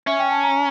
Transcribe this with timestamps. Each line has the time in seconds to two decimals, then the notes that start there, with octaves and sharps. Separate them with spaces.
0.07 C#4 E5
0.19 G5
0.31 A5
0.43 A#5